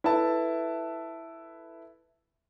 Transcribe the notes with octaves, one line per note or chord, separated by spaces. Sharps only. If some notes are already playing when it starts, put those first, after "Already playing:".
E4 A4 B4 E5 A5